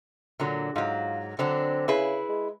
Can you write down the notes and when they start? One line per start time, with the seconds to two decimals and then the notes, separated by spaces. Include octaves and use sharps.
0.40 A#2 D3 F#3
0.76 G#2 F#3 F4
1.39 D3 F#3 C4 D4
1.88 C#3 E4 G#4 B4
2.29 G#3